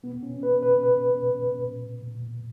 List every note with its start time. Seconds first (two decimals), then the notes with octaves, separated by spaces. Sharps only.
0.03 B2 B3
0.23 B2 C#4
0.43 B2 B4
0.63 B2 B4
0.83 B2 B4
1.03 B2
1.23 B2
1.43 B2
1.63 A#2
1.83 A#2
2.03 A#2
2.23 A#2